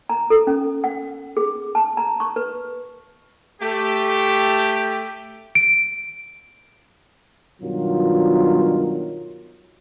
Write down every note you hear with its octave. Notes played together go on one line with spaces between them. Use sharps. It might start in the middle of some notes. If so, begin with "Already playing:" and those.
A#5
A4
C#4
F#5
G#4
A5
A#5
C#6
B4
A3 G4
D7
G2 B2 D#3 F#3 F4